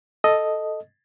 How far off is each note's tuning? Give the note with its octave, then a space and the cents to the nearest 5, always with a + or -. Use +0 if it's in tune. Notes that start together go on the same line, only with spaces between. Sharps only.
A4 +0 D#5 +0